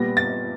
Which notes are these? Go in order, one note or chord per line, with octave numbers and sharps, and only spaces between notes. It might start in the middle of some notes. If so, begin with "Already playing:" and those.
Already playing: A#2 G3 B3 A#6
A6